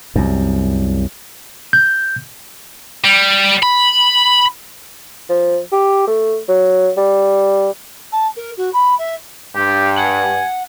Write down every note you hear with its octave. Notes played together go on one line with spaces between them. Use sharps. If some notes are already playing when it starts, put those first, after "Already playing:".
C2 F#2
G6
G3
B5
F3
G4
A3
F#3
G3
A5
A#4
F#4
B5
E5
G2 G4
F#5 G#5